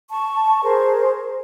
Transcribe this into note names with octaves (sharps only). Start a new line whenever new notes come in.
A5 C#6
G#4 A#4 C5